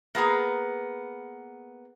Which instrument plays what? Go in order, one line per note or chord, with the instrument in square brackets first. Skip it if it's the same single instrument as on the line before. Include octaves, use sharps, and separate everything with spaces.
[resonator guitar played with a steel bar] A#3 B3 G#4 A#5